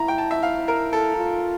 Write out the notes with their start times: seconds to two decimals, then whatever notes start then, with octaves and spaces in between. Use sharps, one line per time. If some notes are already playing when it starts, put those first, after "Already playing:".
Already playing: E4 A#5
0.08 G5
0.18 A5
0.31 E5
0.43 F5
0.68 A#4
0.93 A4
1.17 F4